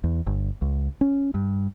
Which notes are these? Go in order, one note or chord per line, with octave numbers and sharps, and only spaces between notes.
E2
G1
C#2
C#4
G2